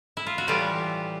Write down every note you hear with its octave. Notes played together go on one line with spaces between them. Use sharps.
E4
F4
F#4
A2 E3 G3 F4 G4